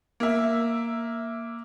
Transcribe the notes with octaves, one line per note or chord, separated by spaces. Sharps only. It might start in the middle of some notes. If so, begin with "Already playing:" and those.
A#3 E5